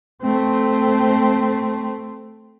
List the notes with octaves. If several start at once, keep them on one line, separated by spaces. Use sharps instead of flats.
A3 C4